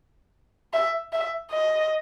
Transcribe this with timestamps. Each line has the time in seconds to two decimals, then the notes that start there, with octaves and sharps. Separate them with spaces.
0.73 E5
1.13 E5
1.51 D#5